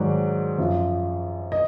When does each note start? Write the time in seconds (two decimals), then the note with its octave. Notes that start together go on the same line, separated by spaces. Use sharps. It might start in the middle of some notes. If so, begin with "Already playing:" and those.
Already playing: G#2 D#3 F#3 D5
0.58 F#2 F3
1.52 D#5